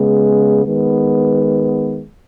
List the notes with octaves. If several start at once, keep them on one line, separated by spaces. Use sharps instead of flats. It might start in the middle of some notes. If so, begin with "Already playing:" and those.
Already playing: C#3 G#3 B3
D#3 G#3 B3